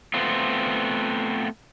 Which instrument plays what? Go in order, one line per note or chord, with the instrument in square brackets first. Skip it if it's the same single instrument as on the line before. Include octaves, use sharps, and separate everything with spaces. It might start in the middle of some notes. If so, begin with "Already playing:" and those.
[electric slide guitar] A3 B3 C4 F4